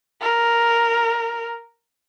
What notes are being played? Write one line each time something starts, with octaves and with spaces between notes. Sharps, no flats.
A#4